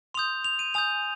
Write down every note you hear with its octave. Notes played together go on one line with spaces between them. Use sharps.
C6 D#6 G6 F7
F7
D#7
G#5 D#6 G6 F7